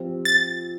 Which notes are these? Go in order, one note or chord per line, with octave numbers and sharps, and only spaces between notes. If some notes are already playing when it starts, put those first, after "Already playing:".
Already playing: F3 C4 G4
A6